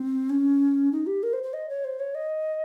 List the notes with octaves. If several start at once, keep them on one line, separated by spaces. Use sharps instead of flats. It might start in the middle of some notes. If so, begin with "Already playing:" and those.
Already playing: C4
C#4
D#4
G4
A#4
C5
C5
D#5
C#5
C5
C#5
D#5